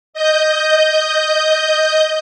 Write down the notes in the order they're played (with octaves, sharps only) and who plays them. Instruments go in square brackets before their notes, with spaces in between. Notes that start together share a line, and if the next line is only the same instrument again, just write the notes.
[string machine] D#5 G6